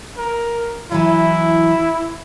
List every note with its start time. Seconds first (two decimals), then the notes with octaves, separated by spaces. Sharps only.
0.17 A#4
0.92 E3 F#3 E4